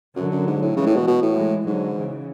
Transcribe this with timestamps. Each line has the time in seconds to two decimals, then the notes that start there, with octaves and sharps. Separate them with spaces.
0.16 F#2 D3 F#3
0.32 F#2
0.47 G#2
0.62 A2
0.76 C#3 E3 G#3
0.86 A2
0.96 B2
1.07 B2
1.22 A2
1.36 E3 G#3
1.66 G#2 D3 F#3
1.96 C#3 E3